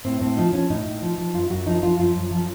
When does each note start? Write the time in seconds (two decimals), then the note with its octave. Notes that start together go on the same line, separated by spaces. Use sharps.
0.05 A2 C4
0.21 A2 C4
0.37 F3 D#4
0.53 F3 C#4
0.70 A2 D#4
0.86 A2
1.02 F3
1.18 F3
1.34 F#2 F4
1.50 F#2 F#4
1.66 F3 D#4
1.82 F3 F4
1.99 F#2 F4
2.16 F#2
2.31 F3